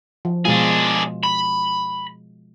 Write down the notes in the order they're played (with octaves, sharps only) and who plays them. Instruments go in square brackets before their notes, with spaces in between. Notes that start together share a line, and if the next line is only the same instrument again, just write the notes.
[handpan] F3
[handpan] B2 G#3 F4 [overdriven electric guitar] D4 G#4
[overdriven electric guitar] B5